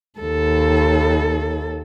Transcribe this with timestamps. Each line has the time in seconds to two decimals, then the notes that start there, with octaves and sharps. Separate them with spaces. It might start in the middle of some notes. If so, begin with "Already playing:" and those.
0.19 D#2 A4